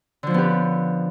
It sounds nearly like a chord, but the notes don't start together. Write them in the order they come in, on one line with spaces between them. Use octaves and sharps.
D3 F3 C#4 B3 G4